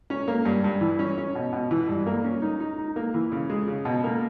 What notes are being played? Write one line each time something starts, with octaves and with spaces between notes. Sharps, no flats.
C#4
A#3
G2
G2
E3
C#4
C#4
B2
B2
E3
G2
A#3
C#4
D#4
D#4
D#4
A#3
E3
C#3
G#3
C#3
B2
A#3